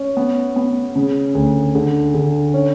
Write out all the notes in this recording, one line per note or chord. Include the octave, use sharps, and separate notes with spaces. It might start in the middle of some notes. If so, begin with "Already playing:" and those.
Already playing: C#4
B3
B3
C#3
D2
D3
D3
C#4